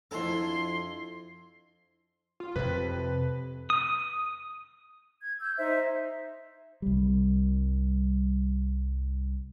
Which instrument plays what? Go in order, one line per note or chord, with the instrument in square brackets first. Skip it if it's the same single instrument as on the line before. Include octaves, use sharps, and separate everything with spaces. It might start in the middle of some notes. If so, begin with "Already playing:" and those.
[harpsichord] F2 A4 [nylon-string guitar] D4 E4 [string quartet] C6
[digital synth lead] F4
[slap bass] F2 [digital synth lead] C3 [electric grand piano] B4
[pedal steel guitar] D#6
[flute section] G#6
E6 G6
D#4 C5 E5
[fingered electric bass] C2 G3